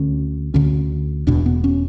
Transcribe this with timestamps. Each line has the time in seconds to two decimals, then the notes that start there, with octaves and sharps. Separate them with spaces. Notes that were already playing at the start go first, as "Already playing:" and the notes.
Already playing: D2 D3 C#4
0.54 D2 D3 C#4
1.27 E1 E2 B2 D4
1.46 B3
1.64 C#4